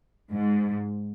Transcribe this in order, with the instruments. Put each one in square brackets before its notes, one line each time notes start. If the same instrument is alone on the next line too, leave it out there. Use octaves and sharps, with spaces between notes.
[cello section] G#2